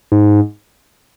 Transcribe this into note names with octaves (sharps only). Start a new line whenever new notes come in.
G#2